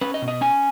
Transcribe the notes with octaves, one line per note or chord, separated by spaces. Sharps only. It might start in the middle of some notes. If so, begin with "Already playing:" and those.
C#4 B4
D#5
B2
D#5
C#4 G#5